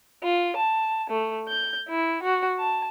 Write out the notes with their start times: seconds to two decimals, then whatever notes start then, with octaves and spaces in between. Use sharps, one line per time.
0.23 F4
0.56 A5
1.10 A3
1.48 G6
1.88 E4
2.22 F#4
2.58 A5